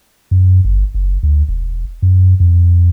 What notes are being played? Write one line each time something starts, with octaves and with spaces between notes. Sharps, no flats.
F#2
G1
F#1
D2
E1
F#2
F2